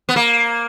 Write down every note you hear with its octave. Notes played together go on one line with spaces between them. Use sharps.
B3
A#3